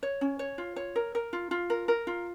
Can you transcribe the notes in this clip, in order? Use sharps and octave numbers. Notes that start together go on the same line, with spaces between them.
C#5
C#4
C#5
F4
C#5
A#4
A#4
F4
F4
A#4
A#4
F4